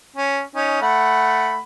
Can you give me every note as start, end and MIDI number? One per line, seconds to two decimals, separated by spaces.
0.17 0.41 61
0.55 0.81 61
0.55 0.81 63
0.82 1.59 57
0.82 1.59 78
0.82 1.59 83